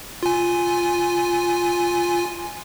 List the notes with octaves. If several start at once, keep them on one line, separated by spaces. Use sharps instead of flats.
F4 G#5